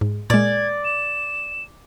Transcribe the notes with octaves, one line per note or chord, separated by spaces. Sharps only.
G#2
A#2 G#3 D5 G#6
E7